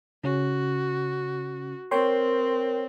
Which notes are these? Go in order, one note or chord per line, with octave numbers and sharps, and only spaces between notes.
C#3 C#4 F#4
C4 A#4 C#5 G5 C6